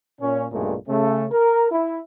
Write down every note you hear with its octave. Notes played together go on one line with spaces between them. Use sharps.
A#2 C#4
B1 G2 A#2 C#3 G#3 A3
C#3 A3 C#4
A#4
E4